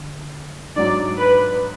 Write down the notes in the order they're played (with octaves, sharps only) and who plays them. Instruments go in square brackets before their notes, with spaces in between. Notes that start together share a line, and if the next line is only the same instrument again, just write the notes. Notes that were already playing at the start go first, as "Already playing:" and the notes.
Already playing: [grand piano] D3
[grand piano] G#2 F#3 D4 [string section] D5
[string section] B4